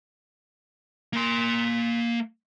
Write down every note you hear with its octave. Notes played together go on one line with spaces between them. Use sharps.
A#3 C6